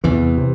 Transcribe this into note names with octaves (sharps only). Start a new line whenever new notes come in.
E2 C3 E3
C3